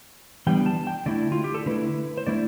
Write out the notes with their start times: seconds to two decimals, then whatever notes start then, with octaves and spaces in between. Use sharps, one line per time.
0.47 E3 G3 B3 D4 G5
0.66 A5
0.87 G5
1.06 D3 A3 E4 D5
1.32 F4
1.44 G4
1.54 A4
1.66 D3 A3 E4 B4
2.17 C5
2.27 D3 A3 E4 D5